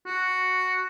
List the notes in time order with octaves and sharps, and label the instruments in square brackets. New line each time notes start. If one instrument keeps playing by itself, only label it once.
[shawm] F#4